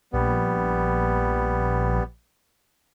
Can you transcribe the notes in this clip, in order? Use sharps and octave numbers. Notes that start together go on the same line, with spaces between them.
A#1 G3 B3